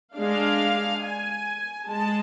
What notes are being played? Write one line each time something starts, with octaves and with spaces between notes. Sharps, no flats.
G#3 D4 F5
G#5
G#3 A5